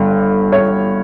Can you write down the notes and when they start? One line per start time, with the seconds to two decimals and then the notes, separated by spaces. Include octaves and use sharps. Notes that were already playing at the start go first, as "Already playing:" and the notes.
Already playing: G1 G2 D3
0.52 C#5